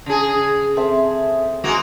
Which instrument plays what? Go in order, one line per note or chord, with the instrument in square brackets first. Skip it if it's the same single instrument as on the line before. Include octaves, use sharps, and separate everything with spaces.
[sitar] C#3 G#4
[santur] C4 A4 E5
[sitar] G#3 A#3 F#4